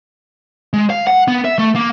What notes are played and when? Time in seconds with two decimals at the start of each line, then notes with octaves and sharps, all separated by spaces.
0.73 G#3
0.90 F5
1.07 F#5
1.28 B3
1.45 E5
1.59 A3
1.75 A#3